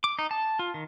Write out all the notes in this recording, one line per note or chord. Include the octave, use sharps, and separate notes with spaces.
D6
D#4
A5
F4
D#3